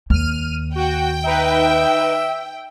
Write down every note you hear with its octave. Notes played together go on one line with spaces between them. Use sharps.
D#2 F6 D#7
F#4 G5
D#4 B4 E5